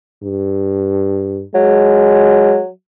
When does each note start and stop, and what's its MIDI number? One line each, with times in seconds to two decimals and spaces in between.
0.24 1.43 43
1.55 2.68 54
1.55 2.60 56